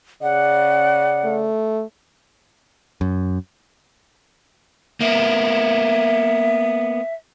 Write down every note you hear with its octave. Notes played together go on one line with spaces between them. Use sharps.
C#3 D5 F#5
A3
F#2
A#3 B3 E5